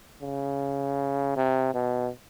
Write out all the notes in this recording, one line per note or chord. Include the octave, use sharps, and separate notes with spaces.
C#3
C3
B2